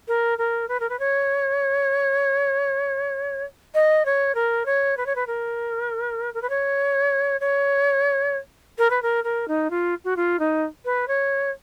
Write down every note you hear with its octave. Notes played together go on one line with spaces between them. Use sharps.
A#4
A#4
B4
A#4
B4
C#5
D#5
C#5
A#4
C#5
B4
C#5
B4
A#4
A#4
B4
C#5
C#5
A#4
B4
A#4
A#4
D#4
F4
F#4
F4
D#4
B4
C#5